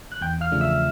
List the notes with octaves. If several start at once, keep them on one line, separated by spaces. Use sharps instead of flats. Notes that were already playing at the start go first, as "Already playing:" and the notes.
F#6
E2 G5 G6
F5 F6
C#3 F3 A3 D4
E5 E6